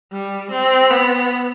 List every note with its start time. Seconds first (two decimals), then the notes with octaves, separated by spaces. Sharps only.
0.12 G3
0.51 C4
0.91 B3